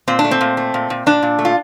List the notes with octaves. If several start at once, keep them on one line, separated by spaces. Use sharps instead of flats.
A#2 C4
D4
A3
C4
A#2
A3
A#2
A#2
A#2 D4
A#2
A3
F4